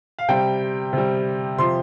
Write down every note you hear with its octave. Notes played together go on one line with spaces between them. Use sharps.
F5
C3 G3 G5
C3 G3
C3 F3 C6